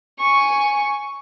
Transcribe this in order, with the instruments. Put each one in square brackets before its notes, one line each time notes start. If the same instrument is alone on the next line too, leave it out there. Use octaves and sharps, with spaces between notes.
[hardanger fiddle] G#5 C#6